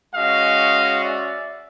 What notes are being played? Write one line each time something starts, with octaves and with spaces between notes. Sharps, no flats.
G#3 C#4 F#4 D#5 F5
D5 E5